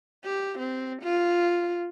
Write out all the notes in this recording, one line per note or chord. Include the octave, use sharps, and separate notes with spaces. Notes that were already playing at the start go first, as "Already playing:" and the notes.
G4
C4
F4